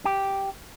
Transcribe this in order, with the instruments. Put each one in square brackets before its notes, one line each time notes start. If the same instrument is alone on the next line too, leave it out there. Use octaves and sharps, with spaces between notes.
[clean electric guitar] G4